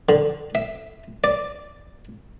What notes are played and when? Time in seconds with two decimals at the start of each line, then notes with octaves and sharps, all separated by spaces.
0.09 D3
0.55 E5
1.24 D5